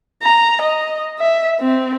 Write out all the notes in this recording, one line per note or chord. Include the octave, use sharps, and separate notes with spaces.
A#5
D#5
E5
C4